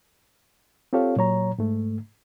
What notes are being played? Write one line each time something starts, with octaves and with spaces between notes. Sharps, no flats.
C4 F4 G4 A4 C#5 F5
A#2 F#3 C#5 A#5
G#2 A3